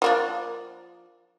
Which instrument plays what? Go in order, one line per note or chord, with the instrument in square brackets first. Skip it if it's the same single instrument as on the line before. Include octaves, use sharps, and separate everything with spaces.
[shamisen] F3 A#3 D4